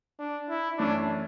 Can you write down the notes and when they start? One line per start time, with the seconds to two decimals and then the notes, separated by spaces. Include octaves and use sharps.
0.20 D4
0.49 E4
0.78 F#2 E3 A3 C#4 D4 E4